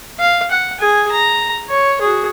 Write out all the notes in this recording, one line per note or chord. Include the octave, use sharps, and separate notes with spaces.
F5
F#5
G#4 G#5
A#5
C#5
F#4 G#4